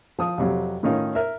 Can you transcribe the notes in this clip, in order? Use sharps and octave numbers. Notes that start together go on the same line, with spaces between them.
F3 D#6
F2 C3 F#3
A2 D#3 C#4 D#4 F4
A#4 E5